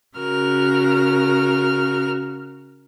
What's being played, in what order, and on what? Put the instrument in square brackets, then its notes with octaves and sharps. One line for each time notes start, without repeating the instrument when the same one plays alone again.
[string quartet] C#3 F#4 A#4 F6